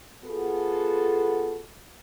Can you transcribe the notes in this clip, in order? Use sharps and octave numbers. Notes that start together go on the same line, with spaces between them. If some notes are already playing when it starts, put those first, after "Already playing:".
B3 F4 F#4 G#4 A4